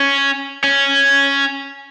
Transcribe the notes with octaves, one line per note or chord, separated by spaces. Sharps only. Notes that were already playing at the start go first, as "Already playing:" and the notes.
Already playing: C#4
C#4